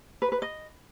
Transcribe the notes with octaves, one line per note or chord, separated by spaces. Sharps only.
B4
B4
D#5